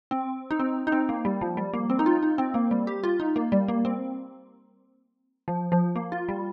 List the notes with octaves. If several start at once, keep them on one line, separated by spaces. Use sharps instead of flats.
C4
D#4
C4
D#4
C4
A#3
G3
F3
G3
A#3
C4
D#4
F4
D#4
C4
A#3
G3
G4
F4
D#4
A#3
G3
A#3
C4
F3
F3
A#3
F4
G3